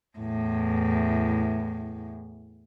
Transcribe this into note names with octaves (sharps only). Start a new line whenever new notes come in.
E2 A2